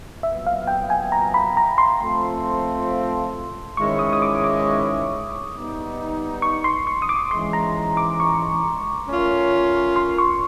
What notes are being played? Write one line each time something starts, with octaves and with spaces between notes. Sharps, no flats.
A#2 F#3 B3 E5
F5
G5
G#5
A#5
B5
A#5
C6
F3 A3 C4 F4 A4
G#2 D#3 G#3 C#4 E4 C#6
D#6
D#6
D6
D6
G3 B3 D#4
C#6
C6
C#6
D#6
D6
G#2 E3 G#3 C#4 C6
A#5
D6
C#6
A3 C#4 F4 A#4 C#5
C6
C#6